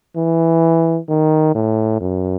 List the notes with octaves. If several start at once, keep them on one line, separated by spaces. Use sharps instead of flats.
E3
D#3
A2
F#2